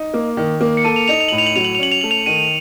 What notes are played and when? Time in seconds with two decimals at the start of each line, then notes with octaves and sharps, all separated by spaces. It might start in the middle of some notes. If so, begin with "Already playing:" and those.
Already playing: D#4
0.14 A#3
0.37 D#3
0.61 A#3
0.77 C#7
0.84 A4 D#7
0.96 F7
1.08 D#4 F7
1.20 F7
1.28 A2 F#7
1.38 F7
1.47 F#7
1.56 F#3 F7
1.65 F#7
1.75 F7
1.79 C#4 F#7
1.92 F7
2.01 A3 F#7
2.11 F7
2.26 D#3 D#7